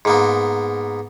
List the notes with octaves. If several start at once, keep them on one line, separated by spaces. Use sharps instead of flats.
G#2 A#3 B3